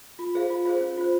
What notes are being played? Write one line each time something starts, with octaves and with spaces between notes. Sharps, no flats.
F4
G#4 C5 F5
F4
G#4 C5 F5
C#4
F4 C5